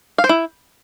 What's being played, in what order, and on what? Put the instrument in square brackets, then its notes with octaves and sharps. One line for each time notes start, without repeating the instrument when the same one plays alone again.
[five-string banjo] F5
C5
E4